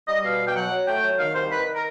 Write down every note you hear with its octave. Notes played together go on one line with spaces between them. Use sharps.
G3 D#5
B2 F5
B2
G5
F#3 F#5
F#3
A3 G5
F#3
D#3 F5
C2 C5
D#3 B4
A#4